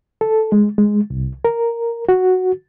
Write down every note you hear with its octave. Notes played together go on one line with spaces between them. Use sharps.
A4
G#3
G#3
C2
A#4
F#4